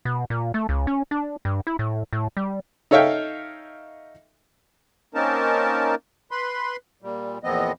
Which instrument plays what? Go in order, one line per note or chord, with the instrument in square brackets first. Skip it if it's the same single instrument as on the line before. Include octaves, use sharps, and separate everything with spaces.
[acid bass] B2
A#2
A3
C#2
C#4
D4
G2
E4
A2
A2
G3
[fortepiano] D#4 A4 C#5 E5 F5 G5
[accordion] A#3 C4 C#4 D#4 A#4 A5
B4 B5 C6
A#2 G3
E2 A#2 F3 B3 C4 D#5